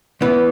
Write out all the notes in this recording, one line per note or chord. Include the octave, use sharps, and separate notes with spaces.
E2 E3 B3